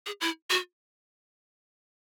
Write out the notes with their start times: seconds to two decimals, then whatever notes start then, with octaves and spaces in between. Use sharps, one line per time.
0.06 G#4
0.21 E4
0.50 F#4